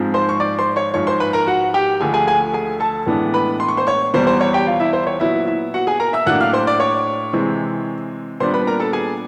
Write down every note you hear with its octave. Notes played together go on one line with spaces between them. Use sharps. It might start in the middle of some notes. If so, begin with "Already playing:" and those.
Already playing: G#2 F3 G#3 C4
C5 C6
C#6
D5 D6
C5 C6
C#5 C#6
G#2 F3 G#3 C#5 C#6
C5 C6
B4 B5
A#4 A#5
F#4 F#5
G4 G5
D2 D3 F3 A3 G#4 G#5
G#4 G#5
G#4 G#5
G#4 G#5
A4 A5
A2 E3 G#3 B3 D4
B4 B5
C6
C#6
C5 C6
C#5 C#6
E2 B2 G3 C5 C6
C5 C6
C#5 C#6
G4 G5
F4 F5
E4 E5
C5
C#5
A#2 F#3 B3 E4 E5
E4 E5
F#4 F#5
G#4 G#5
A#4 A#5
E5 E6
A2 F#3 A#3 D4 F#5 F#6
F5 F6
C5 C6
D5 D6
C#5 C#6
C3 E3 G#3 C4
A#2 G3 B3 D4 C5 C6
B4 B5
A#4 A#5
A4 A5
G#4 G#5